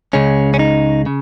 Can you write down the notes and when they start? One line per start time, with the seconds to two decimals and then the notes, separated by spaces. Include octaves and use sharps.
0.13 C#2 C#3 G#3 C#4
0.54 C#4
0.59 D#4
1.06 C#3